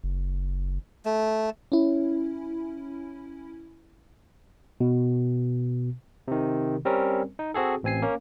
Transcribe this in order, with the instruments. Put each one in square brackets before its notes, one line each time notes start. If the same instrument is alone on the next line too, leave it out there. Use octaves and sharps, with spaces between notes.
[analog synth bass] F#1
[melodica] A3
[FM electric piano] C#4 E4
[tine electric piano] B2
C3 D#3
G3 C4 C#4 A#4
D#4
C4 F#4 G#4 A4
A1 C4 G#5 C7
A#3 C#4